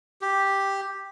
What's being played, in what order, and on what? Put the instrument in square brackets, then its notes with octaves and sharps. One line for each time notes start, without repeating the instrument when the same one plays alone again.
[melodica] G4